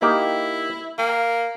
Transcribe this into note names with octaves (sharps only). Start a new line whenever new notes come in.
A#3 D#4 E4 G4
A#3 G5